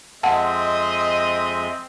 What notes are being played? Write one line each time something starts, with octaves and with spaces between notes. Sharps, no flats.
F2 G#3 C4 D#5 E5 F#5 A5